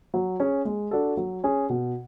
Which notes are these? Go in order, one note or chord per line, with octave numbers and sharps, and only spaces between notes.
F#3
C#4 G#4
G#3
D4 F#4 A4
F#3
C#4 G#4
B2